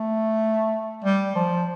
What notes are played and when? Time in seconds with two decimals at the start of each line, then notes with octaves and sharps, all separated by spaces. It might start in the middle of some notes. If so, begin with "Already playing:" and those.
Already playing: A3
1.04 G3
1.35 F3